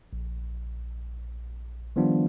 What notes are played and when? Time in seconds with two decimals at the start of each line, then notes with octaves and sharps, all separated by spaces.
0.13 A#1
1.96 D#3 F3 G3 B3 D4 F4